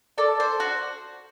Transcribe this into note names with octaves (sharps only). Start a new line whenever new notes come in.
A4 D5
C5
F#4